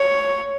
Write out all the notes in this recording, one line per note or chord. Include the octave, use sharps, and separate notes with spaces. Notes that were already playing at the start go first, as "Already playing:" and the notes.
Already playing: C#5